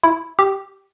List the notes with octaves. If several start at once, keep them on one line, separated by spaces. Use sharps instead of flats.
E4
G4